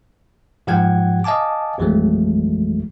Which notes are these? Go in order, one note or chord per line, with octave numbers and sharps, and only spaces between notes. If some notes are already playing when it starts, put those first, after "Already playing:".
G#2 F3 G4 F#5 G5 G#6
D#5 F5 G#5 A5 D6
A1 F2 E3 F#3 G#3 A3